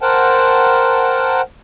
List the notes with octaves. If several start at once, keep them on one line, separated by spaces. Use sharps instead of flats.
A#4 C5 F#5 G5 A5